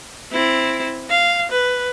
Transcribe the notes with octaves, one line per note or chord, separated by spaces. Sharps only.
C4 E4
F5
B4